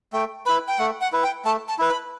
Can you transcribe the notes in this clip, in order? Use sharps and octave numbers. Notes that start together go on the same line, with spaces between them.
A3 G5
E4 B4 B5
G5
A3 F#5
F#5
E4 B4
G5
A3 A5
A5
E4 B4
B5